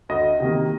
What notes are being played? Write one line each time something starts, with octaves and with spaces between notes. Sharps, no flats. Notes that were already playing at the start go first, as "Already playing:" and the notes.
D2 D#5
C3 D#3 A#3